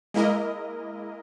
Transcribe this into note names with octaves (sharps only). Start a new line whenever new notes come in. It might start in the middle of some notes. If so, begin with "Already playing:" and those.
G#3 A#3 E4 A#4 D#5